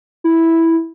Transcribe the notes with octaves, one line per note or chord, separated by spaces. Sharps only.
E4